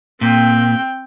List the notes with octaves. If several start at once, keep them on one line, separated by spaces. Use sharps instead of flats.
A#2 C4 G5